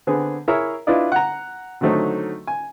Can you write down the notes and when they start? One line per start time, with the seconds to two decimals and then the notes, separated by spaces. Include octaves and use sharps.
0.07 D3 B3 C4 G#4
0.48 E4 G#4 A#4 C#5 E5 A#5
0.87 D4 E4 F4 B4 D5 D#5
1.12 F#5 A#5
1.81 D3 D#3 F#3 A3 C4 D#4
2.47 G#5